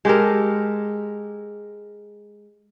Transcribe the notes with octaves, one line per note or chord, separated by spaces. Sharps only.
G#3 G4 A4 A#4